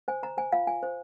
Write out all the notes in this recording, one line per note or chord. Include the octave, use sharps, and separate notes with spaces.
C5 G#5
C5 A#5
C5 G#5
F4 F5
F4 G#5
C5